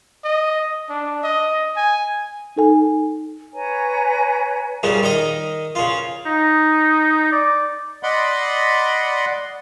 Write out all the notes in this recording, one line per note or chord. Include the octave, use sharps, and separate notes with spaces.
D#5
D4
D#5
G#5
D#4 A4 G#5
B4 C#5 G#5 A#5
A#2 C#3 G3
D#3 D#4 D#5
C#3 F4
D#4
D5
D5 D#5 F#5 B5 C6